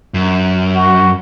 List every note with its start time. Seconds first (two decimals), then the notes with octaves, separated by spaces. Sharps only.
0.14 F#2
0.75 F#4